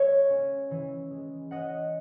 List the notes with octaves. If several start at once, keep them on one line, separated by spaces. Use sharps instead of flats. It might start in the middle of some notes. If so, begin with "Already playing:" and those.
Already playing: G#3 C#5 E5
C#4
E3
G#3
C#4 D#5 F#5